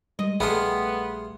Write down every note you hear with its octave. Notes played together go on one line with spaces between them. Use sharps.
G3 G#3 D#5
A#1 G3 A3 B3 G#4 E5 F5 C6